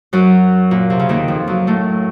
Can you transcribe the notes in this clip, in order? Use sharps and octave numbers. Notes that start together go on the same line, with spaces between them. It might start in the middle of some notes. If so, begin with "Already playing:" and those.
F#2 F#3
A#2
C3
C#3
D#2 D#3
F2 F3
F#2 F#3
A2 A3